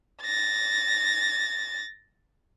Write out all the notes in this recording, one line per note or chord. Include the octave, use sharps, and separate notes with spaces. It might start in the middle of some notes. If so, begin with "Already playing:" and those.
A6 A#6